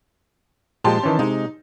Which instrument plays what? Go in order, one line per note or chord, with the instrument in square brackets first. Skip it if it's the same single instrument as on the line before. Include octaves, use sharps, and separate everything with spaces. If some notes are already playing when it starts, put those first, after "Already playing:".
[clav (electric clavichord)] A#2 F3 G#3 [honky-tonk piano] G4 A5 C6
[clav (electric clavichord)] D#3 E3 C#4
[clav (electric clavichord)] C3 G#3 [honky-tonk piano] D#4